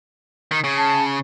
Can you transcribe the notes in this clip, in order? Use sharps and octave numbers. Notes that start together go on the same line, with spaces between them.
D#3
C#3
A5